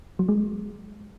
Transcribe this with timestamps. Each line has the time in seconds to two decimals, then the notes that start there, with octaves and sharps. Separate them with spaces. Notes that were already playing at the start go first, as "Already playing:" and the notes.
0.19 F#3
0.29 G#3